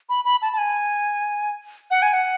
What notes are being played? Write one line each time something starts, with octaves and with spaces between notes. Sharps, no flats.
B5
B5
A5
A5
G#5
F#5
G#5
F#5